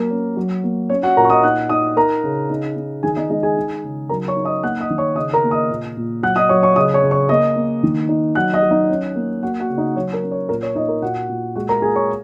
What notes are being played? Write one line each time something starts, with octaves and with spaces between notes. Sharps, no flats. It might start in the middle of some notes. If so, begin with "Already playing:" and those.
Already playing: F#3 A#3 A#4
C#4
F#3
A#3
C#4 C#5
F#4 F#5
A#2 A#4 A#5
C#6
D#5 D#6
D#4 F#5 F#6
D#4 D#5 D#6
D#4 A#4 A#5
C#3
D#4
D#4
D#3 G#4 G#5
D#4 D#5
G#3 D#4 D#5
G#4 G#5
D#4
C#3
F#3 A#4 A#5
C#5 C#6
D#4
D#5 D#6
A#3 F#5 F#6
D#5 D#6
D#3
C#5 C#6
C#3 D#5 D#6
A#4 A#5
A#3
D#5 D#6
A#2
A#2
F#3 F#5 F#6
D#5 D#6
F#3 C#5 C#6
C#5 C#6
C#3 D#5 D#6
C#5 C#6
C#3
C#5 C#6
A#3 D#5 D#6
A#3
D#3
D#4
F#3 F#5 F#6
D#5 D#6
F#3
D#4 D#5
C#4
A#3
A#3 F#4 F#5
F#4 F#5
C#3
D#4 D#5
F#3 C#5
A#4
C#4
C#5
A#2 A#4
C#5
A#2 D#4 D#5
A#4
A#2 F#4 F#5
A#2
G#3 F#4 F#5
A#4 A#5
A#2 G#4 G#5
C#5 C#6